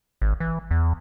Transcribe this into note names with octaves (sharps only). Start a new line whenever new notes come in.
G#1
E3
E2